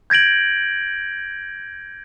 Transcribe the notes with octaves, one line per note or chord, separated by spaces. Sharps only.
G6 G#6 A#6 D7 F#7